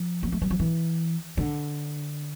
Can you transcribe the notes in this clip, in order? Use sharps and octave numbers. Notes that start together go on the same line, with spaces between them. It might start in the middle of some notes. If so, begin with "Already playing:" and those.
Already playing: F3
A#3
A3
G3
F3
E3
D3